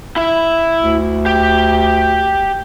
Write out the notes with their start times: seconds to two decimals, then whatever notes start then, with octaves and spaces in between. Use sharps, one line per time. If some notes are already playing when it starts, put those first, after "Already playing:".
0.16 E4 E5
0.81 D2
1.26 G4